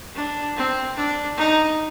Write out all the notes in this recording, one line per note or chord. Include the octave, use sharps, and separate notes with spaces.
D4
C4
D4
D#4